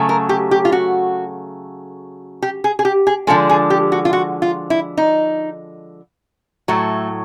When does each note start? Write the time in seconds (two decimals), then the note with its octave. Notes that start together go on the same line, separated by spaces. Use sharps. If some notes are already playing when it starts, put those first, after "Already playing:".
Already playing: C#3 F#3 A3
0.09 A#4
0.29 G4
0.51 G4
0.65 F4
0.72 F#4
2.42 G4
2.64 G#4
2.79 G#4
2.85 G4
3.07 G#4
3.27 D3 F3 G#3 A4
3.50 G#4
3.70 G4
3.92 F#4
4.05 F4
4.13 F#4
4.42 F4
4.70 E4
4.97 D#4
6.68 A2 F#3 A3